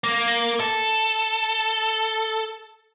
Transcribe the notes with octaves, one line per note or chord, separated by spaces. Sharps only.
A#3
A4